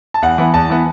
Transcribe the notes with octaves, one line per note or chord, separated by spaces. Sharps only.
A5
E2 F#5
E3 B3
E2 A5
E3 B3